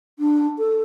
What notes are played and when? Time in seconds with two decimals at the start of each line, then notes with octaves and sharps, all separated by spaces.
0.19 D4
0.59 A4